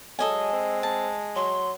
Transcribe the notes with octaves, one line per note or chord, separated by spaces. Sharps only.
F#3 G#3 A4 D#5 G#5
C4
A5
F#3 C6